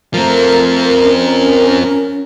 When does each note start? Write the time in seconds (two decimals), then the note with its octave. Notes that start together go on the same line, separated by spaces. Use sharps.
0.14 F3 A3 C4 A#4
1.03 C#4